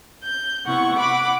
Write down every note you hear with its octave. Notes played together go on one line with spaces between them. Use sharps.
G6
C3 B3 E4 F#5 C#6
F#5 B5 D6